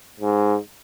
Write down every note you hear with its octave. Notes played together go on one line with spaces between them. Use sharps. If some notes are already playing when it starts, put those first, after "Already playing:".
G#2